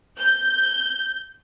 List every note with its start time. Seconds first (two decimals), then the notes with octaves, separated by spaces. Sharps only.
0.17 G6